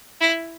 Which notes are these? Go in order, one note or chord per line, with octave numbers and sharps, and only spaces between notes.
E4